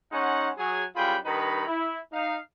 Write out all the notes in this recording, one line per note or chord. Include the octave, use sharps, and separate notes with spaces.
G#3 C#4 D#4 F#5
F#3 G#4 G#5
F#2 G3 F4 G#4 G5 B5
G2 D#3 D#4 B4 A#5 B5
E4
D#4 F5